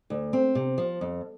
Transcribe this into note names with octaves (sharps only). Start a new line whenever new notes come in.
D2
C4
C3
F3
F2